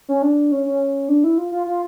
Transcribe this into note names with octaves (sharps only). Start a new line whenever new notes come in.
C#4
D4
C#4
C#4
D4
E4
F4
F4
F4